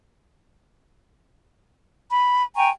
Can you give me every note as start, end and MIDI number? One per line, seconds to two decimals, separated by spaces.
2.11 2.42 83
2.55 2.69 79
2.55 2.69 80
2.55 2.69 82
2.55 2.69 85